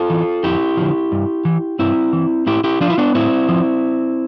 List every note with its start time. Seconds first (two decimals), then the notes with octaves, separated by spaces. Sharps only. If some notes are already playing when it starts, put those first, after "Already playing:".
Already playing: F4 A4
0.10 E3
0.43 F2 E4 G4
0.77 D3 F3
1.12 G2
1.45 E3
1.79 G2 C4 E4
2.13 E3
2.47 A2 E4 G4
2.64 E4 G4
2.80 F3 D4 F4
2.90 E4
2.98 B3 D4
3.15 A2 C4 E4
3.49 F3